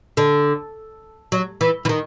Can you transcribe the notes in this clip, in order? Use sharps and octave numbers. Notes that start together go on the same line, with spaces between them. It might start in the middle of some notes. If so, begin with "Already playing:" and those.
D3
F#3
E3
E3
D#3